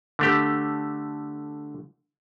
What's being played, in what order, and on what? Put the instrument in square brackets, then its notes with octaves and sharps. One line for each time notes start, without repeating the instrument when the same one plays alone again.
[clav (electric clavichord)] D3 A3 G4